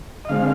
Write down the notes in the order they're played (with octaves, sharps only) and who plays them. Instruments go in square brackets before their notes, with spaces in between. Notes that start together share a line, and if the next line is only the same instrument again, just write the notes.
[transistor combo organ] D#5
D3 G#3 C4 F5